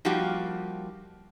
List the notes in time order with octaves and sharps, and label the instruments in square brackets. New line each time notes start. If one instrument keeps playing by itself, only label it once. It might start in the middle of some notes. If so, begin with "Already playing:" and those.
[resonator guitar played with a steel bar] F3 G3 A#3 D#4 F#4 G4